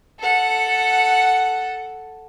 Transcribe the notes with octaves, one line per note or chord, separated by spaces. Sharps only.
A4 F#5